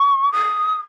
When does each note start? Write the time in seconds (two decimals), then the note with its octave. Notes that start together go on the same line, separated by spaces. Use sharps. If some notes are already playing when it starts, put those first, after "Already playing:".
Already playing: C#6
0.32 D#6